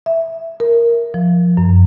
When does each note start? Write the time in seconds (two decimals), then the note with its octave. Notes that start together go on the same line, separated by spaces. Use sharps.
0.06 E5
0.60 A#4
1.14 F3
1.57 F#2